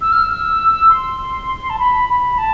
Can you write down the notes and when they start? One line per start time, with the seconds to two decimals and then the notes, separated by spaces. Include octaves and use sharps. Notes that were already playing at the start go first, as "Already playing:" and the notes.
0.01 E6
0.12 F6
0.23 E6
0.90 C6
1.70 A5
1.79 B5
2.09 B5
2.38 A5